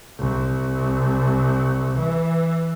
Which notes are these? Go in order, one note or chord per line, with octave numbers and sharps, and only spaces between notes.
C2
E3